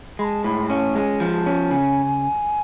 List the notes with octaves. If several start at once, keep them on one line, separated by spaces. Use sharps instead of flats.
G#3 B5
A5
A2 B5
C#4 A5
G#3
F3
A5
C#4
C#3 G#5